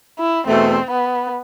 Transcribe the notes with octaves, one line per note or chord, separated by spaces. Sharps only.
E4
E2 B2 A3 C4
B3